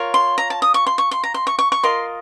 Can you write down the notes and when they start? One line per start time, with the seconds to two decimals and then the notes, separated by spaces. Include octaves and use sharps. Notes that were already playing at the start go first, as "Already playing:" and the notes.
Already playing: F4 A#4 C#5
0.14 C6
0.38 A#5
0.50 A5
0.62 D#6
0.74 C#6
0.87 C6
0.98 C#6
1.11 C6
1.24 A#5
1.34 C6
1.47 C#6
1.59 C#6
1.72 C#6
1.83 F4 A#4 D#5 C6